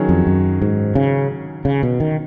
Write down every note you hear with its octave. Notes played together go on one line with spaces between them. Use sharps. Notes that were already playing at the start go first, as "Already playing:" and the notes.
Already playing: D#3 F#3 C#4 G#4 C#5
F2
F#2
G#2
C#3
C#3
B2
D#3